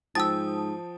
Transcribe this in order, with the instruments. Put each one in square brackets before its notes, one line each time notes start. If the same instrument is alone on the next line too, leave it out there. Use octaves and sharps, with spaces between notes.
[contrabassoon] G#2 [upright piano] F3 G5 [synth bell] A5 D#6 [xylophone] E6 A6